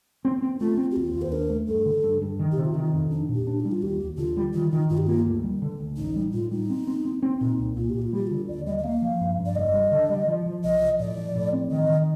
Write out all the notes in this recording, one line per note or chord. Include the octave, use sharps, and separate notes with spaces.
C4
C4
A3 F4
C4
G4
D#2 F4
D#2
C5
D4 A#4
A3
G2 A4
D3
G2
G2
D#3
G4
C3
F4
D#3 D#4
F2
D4 D#4
A#2
G4
D4
D#4
G3
F4
D#2 G4
D#2
D3 F4
G3
D#3 F4
D#3 D#4
G2 F4
G4
A#3 F4
D2
G3
D3
D2
A1 D#4
G3
A2 F4
G3 D#4
C4
C4
C4
C4
A#2 D#4
C2
A#2 F4
A#2 G4
F4
G3 G4
D3 F4
D#2 D5
G3 D#5
D#5
A#3 F5
F3
G2
G2
D5
F1 D#5
G3
D3
G3
F3
F3
C2 D#5
F3
A2 D5
F3
A2
C4
D#3 D#5
D#3